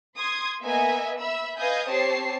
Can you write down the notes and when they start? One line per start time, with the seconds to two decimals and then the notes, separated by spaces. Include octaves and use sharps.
0.18 C6 D#6 G#6
0.61 A#3 B3 B4 D#5 E5 G#5
1.21 E5 B5 E6
1.57 B4 D#5 F5 G#5 D#6 G6
1.88 C4 G4 C#5 A5 C7